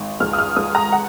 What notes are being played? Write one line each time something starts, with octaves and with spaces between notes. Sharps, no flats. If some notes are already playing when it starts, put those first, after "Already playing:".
Already playing: G#1
C#2 F6
D#6
F6
C#2 D#6
A#5
F#5